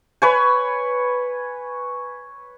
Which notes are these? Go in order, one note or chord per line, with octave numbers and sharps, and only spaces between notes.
B4 C#5 G#5